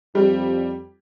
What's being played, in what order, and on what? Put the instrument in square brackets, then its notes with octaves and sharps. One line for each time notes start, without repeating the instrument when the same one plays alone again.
[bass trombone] F2 [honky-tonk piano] G3